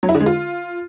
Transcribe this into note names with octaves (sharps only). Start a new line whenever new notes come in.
F#3
E4
D3
G#3
F4